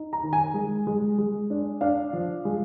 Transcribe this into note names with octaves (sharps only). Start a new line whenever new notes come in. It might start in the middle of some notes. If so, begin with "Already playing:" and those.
Already playing: D#4
A#5
D#3
G#5
G#3
G#3
G#3
D4
D4 F5
F3
G#3